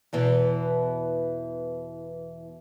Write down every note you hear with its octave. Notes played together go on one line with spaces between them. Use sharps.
E2 B2 E3